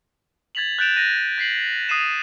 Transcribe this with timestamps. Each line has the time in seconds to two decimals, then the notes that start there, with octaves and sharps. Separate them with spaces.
0.55 G#6 A6 B6 F7 F#7
0.79 F#6 G6 A6 D7 E7 F7
0.96 A#6 D#7
1.38 G#6 B6 C7 F#7
1.89 D#6 F#6 C7 D#7 E7